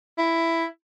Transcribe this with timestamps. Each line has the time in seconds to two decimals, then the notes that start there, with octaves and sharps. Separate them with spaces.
0.18 E4